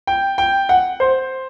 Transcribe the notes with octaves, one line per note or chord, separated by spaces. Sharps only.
G5
G5
F#5
C5